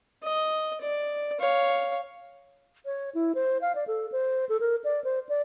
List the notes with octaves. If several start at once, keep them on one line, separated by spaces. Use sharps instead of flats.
D#5
D5
C#5 F5
C#5
E4
C5
F5
D5
A4
C5
A4
A#4
D5
C5
D5